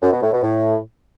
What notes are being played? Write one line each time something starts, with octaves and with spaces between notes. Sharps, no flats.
F#2
B2
A2
B2
A2